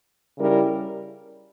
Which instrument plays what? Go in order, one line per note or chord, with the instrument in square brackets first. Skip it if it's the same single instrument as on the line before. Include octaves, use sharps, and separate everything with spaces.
[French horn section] C#3 G3 C#4 E4 A#4